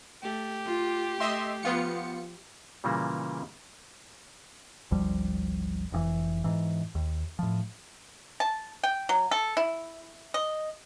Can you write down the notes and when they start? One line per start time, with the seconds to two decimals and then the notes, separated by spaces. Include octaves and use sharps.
0.23 A3 G4
0.65 F4
1.20 A3 D#5 E5 C6
1.63 F3 B3 F4 C#7
2.84 A#2 C#3 E3 G3 A#3
4.91 G#1 D2 F3 G3
5.92 F1 B2 E3
6.44 G#2 E3
6.95 D#2
7.39 A2 F3
8.40 A5
8.83 G5
9.09 F#3
9.31 A4
9.57 E4
10.34 D#5